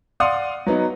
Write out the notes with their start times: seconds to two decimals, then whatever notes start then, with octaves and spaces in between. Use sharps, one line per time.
0.20 D5 F5 F#5 C6 D#6
0.67 F#3 B3 D#4